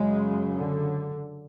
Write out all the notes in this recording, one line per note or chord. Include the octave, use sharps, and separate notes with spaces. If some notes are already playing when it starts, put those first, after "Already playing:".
Already playing: F#2 C#3 G#3
D3